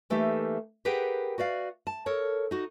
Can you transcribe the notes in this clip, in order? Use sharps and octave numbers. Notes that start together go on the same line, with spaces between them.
E3 A3 A#3 D#4 G4 A4
G4 G#4 A#4 B4 F#5 G5
F#4 B4 D5 F5
A5
A4 A#4 C#5
D#4 F#4